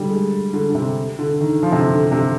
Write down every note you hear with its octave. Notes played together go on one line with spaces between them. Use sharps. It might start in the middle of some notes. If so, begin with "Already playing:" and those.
Already playing: D3 G3
G#3
D3
D3
C3
D3
D#3
F3
C3
D3
D3
C3